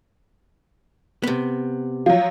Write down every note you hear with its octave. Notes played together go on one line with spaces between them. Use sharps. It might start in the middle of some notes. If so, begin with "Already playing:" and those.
C3 B3
F3 F#3 F5